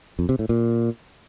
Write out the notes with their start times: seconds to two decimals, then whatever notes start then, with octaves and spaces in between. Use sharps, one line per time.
0.19 F2
0.29 C3
0.39 A2
0.49 A#2